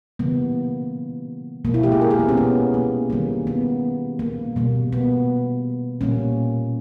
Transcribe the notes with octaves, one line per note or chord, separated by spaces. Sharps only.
C#3 E3 G3 A#3 B3
B2 G#3 A#3
E4
G4
G#4
A#4
G#4
B3
C#4
B3
A#3
D#3 G3 A#3
B3
A#3
B2 G3 A#3
B3
A#2 G3 A#3 C#4